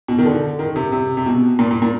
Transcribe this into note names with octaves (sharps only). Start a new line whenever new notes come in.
B2
D#3
D3
D#3
C3
C3
C3
B2
A#2
A#2
A#2